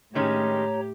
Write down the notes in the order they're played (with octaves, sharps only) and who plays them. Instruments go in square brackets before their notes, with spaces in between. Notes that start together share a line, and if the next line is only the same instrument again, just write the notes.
[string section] A2 [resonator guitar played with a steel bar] D#3 G#3 C#4 [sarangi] G4 [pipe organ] C#5 A#5